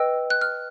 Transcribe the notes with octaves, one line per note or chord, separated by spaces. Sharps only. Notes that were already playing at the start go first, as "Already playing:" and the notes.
Already playing: B4 D#5 G5 E6
F#6
F6